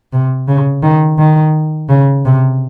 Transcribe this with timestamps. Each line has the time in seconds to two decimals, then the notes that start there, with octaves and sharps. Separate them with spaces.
0.12 C3
0.48 C#3
0.83 D#3
1.19 D#3
1.89 C#3
2.25 C3